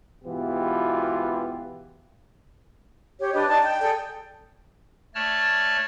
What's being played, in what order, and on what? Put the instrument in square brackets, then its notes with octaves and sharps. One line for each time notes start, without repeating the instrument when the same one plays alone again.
[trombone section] G#2 B2 E3 B3 F4 G4
[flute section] G4 C#5
D4 G4 B4 D#5
D#4 D5 D#5 A5
G5
G#4 A4 D5 G5
[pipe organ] A3 C#5 D5 A5 F6